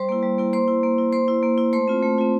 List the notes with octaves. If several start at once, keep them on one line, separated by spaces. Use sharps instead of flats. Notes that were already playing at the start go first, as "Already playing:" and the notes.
Already playing: G3 C5 C6
A#3 E4
G3
A#3 E4
A#3 C5 C6
E4
A#3
E4
A#3 C5 C6
E4
A#3
E4
A3 C5 C6
C4 F4
A3
C4 F4